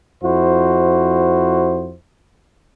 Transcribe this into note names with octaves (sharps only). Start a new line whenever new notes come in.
F2 E4 F#4 C5